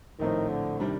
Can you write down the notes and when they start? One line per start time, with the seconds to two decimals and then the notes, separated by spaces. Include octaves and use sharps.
0.19 A#1 A2 D#3 A3 C4
0.50 D3
0.80 C3 D#3 G3 D4